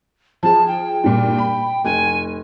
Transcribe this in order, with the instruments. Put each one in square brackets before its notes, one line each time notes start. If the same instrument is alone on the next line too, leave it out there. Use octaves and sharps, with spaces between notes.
[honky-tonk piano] F3 G#4 [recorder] A5
[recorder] G5
[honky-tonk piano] G2 A#2
B5
[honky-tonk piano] F1 [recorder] G#5